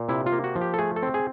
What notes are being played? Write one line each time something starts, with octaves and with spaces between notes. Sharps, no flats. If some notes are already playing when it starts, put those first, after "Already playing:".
Already playing: A#2
C3 E4
F4
A#3
F#4
F3
G4
A4
A3 G#4
A4
C4
G#4